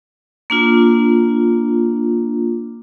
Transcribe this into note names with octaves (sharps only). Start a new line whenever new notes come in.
A#3 D4 F4